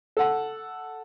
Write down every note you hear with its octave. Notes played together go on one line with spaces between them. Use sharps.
A4 F#5